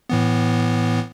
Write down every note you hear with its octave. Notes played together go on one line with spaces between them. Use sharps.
A2 E3 B3